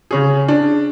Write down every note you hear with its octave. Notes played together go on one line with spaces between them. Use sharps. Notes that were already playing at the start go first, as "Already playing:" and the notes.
C#3 C#4 G#4
D4